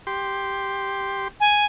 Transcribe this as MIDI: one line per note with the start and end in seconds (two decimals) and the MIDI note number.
0.07 1.28 67
0.07 1.28 84
1.40 1.66 80